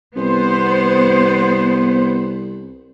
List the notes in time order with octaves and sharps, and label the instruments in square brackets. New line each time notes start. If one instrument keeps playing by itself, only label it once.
[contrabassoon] C2 [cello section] B3 C5